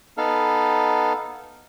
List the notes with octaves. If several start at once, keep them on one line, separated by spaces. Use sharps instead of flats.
B3 D#4 A4 F5